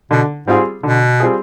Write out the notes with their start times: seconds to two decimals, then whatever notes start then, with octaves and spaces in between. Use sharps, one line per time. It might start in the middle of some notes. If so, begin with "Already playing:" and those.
0.11 B2 D3
0.47 G#2 G3 C4 F4 G#4
0.83 B2 D3
1.20 G3 C4 F4 G#4